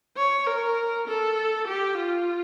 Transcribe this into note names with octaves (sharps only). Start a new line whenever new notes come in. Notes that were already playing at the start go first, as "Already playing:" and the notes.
C#5
A#4
A4
G4
F4